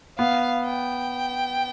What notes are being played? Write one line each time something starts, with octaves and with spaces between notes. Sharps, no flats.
B3 F5
G5